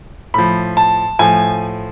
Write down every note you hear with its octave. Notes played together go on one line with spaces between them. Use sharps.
A2 F3 B5
A5
A2 F3 G#5